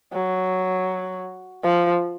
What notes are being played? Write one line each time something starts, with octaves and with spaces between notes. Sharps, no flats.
F#3
F3